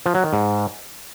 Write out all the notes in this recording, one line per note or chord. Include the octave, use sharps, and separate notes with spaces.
F3
F#3
D#3
G#2